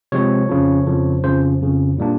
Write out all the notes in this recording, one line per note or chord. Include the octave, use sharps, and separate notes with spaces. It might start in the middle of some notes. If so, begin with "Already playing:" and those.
C3 F3 G#3 C4 C#5
F2 C#3 F3
F2 C#3 F3
F2 C#3 F3 C5
F2 C#3 F3
A#2 G3 A#3 D4